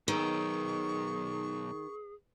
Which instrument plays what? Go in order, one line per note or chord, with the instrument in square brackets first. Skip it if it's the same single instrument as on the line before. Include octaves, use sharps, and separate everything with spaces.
[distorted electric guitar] B1 [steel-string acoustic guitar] D#3 [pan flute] G#4 [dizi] C#6